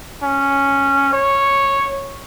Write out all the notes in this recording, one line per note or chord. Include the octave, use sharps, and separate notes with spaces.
C#4
C#5